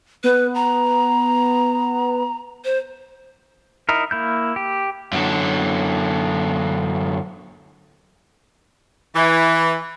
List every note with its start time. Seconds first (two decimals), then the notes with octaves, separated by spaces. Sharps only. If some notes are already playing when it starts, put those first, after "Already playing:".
0.24 B3 B4
0.55 A#5
2.65 C5
3.89 D#4 E4 A#4
4.11 A#3 E4 G6
4.56 G4
5.13 F#2 D3
9.15 E3